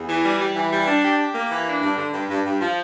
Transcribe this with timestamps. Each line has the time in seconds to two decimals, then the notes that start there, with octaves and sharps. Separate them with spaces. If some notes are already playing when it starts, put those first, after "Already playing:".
Already playing: E2
0.09 E3
0.24 G3
0.40 G3
0.56 E3
0.71 G3
0.87 D4
1.03 G4
1.18 G4
1.35 A#3
1.50 E3
1.66 D4
1.82 G2
1.97 D3
2.13 G2
2.29 G2
2.45 G2
2.61 F3